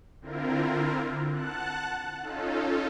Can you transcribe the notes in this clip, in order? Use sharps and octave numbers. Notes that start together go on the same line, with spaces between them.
D3 C4 E4 F4 A#4
F#5 A5 F#6
C#4 D#4 F4 A4